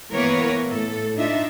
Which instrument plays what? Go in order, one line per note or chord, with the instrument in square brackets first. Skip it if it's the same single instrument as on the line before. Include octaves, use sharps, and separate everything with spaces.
[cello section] E3 A#3 B3 A#4 B4 C#5
A2 A3 A4
D4 D#4 F4 E5